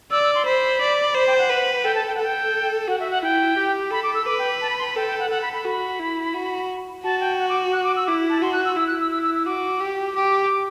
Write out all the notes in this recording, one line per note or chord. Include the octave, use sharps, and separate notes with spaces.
D5 E6
E6
C6
C5 B5
D5
C5 B5
G5
F#5
B4
A4 G5
A5
G5
F#5
A4 G5
F#4 F#5
E5
F#5
E4 G5
G4
A4 B5
D6
E6
B4 D6
G5
A5
B5
C6
B5
A4 G5
G5
F#5
A4 F#5
B5
B5
F#4 B5
E4
F#4
F#4 A5
G5
F#5
D6
F#6
D6
E6
E4 D6
A5
F#4 C6
F#6
E6
E4 E6
F#6
E6
E6
E6
E6
F#4 D6
G4
G4 D6